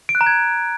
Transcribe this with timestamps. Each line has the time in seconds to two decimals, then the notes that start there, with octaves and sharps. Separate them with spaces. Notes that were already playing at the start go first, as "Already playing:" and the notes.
0.09 D7
0.15 F#6
0.21 A#5
0.26 G#6